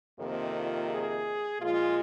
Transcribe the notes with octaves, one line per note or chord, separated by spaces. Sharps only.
F2 C3 D#3 A#3 C4
F4
G#4
A#2 F3 G#3 F4